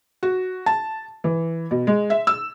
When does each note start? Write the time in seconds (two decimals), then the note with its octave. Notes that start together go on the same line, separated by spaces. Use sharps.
0.23 F#4
0.66 A5
1.24 E3
1.71 B2
1.87 G#3
2.10 E5
2.27 E6